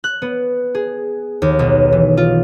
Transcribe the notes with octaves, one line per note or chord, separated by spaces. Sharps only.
F#6
B3
G#4
D#2
B1
E3
F4